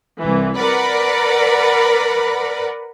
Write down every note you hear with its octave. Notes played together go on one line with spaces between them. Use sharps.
C2 E3
A#4 B4 D5 F#5 B5